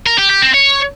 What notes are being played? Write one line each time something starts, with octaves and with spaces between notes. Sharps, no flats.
A#4
G4
G4
C4
C#5